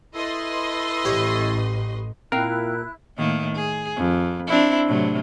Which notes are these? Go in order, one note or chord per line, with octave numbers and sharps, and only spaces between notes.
E4 A4 B4 D#5 C6
A1 G4 C#5
A#2 C4 E4 A#4 F5 G5 F#6
A2 D#3 A#3
G#4
F2
C4 D4 E4
A2 C3 F#3